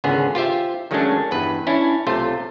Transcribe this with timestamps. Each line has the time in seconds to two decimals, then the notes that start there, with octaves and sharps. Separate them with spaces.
0.04 G#1 C#2 D3 B3 G#4
0.35 F4 G4 C5 E5
0.91 D#3 F#3 G#3 A3 C#4 D4
1.31 E2 G2 B4
1.67 C#4 D4 E4
2.07 B1 C3 A3 F4 C5